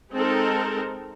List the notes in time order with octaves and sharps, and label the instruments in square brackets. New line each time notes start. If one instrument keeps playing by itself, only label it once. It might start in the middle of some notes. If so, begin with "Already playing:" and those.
[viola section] G#3 C4 D#4 A4 A#4